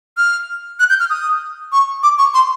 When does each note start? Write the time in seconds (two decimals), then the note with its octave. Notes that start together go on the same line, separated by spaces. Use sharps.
0.18 F6
0.80 F#6
0.90 G6
1.00 F6
1.10 D#6
1.72 C#6
2.03 D6
2.18 C#6
2.34 C6